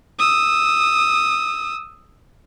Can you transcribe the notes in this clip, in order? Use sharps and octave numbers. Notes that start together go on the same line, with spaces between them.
D#6 E6